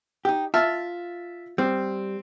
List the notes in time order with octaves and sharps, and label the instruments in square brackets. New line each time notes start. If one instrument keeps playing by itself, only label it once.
[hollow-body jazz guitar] D#4 G4
[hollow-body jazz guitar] F4 [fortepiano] E5 A5 F6
[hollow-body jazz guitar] G3 [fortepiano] C4